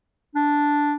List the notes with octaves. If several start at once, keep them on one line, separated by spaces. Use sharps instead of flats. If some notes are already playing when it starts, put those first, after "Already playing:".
D4